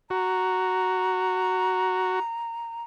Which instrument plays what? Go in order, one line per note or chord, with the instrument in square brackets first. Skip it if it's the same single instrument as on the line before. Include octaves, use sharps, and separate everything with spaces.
[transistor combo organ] F#4 [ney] A#5